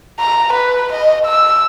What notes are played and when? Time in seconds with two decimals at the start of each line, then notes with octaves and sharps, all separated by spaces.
0.20 A#5
0.53 B4
0.92 D#5
1.25 E6